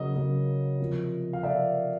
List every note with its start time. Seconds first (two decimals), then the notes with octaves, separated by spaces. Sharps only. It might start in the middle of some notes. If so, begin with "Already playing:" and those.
Already playing: C#3 F#3 A#3 D#5
0.15 C#3 F#3 A#3
0.80 C3 F3 A#3
1.33 F5
1.43 C3 F3 A#3 D5 E5